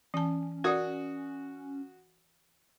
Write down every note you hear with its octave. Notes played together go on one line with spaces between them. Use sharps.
E3 C#4 A5
F#4 A#4 D5 D#6